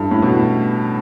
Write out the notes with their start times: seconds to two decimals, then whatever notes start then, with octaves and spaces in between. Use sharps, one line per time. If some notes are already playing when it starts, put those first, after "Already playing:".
Already playing: G2 E4 A4
0.11 A2
0.22 B2
0.34 A2